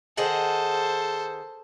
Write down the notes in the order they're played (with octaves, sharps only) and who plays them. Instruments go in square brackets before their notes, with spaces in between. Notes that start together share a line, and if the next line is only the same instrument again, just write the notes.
[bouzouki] D#3 G#4 F#5 [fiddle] A4 C5